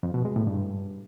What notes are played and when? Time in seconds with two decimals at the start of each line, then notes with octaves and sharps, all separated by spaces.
0.03 F2
0.14 B2
0.25 G#3
0.36 A2
0.47 G2